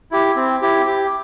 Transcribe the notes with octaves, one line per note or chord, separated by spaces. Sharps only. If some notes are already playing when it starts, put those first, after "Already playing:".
E4 G4
C4
E4 G4
G4